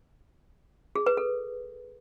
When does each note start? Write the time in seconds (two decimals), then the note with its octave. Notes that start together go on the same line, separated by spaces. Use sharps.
0.95 G#4
1.06 B4
1.17 A4